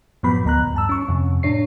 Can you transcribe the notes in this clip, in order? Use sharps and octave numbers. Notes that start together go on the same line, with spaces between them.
F#2 A2 F3 F#3 B3 B5
D2 A#5 F#6
G2 A5 E6
C#4 C#6
F2 C3
A2 D4 C#5 C7